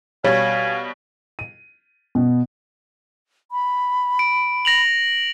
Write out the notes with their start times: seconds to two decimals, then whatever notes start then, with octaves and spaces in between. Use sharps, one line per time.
0.24 B2 G3 C#5 F5 G#5
1.39 D#7
2.15 B2
3.52 B5
4.19 D7
4.65 A#6 F7 F#7